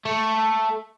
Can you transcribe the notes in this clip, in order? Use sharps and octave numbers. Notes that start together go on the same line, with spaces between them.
A3